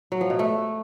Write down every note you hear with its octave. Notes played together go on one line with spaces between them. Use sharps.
F#3
F3
B2
A3